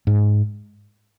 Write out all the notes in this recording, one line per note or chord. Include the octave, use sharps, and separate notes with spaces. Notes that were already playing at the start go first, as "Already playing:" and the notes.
G#2